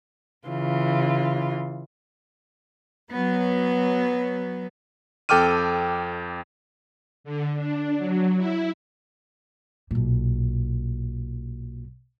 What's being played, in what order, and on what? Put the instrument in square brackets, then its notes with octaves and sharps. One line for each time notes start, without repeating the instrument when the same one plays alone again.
[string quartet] C#3 E3 F4
[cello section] F#3 B3
[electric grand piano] F2 A4 G5 D6 F6 D#7
[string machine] D3
D4
F#3
E4
[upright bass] B1 A#2